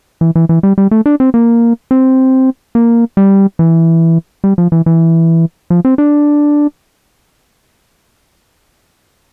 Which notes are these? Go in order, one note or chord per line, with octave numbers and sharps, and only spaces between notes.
E3
E3
E3
G3
G3
A3
D4
C4
A#3
C4
A#3
G3
E3
G3
F3
E3
E3
F3
C4
D4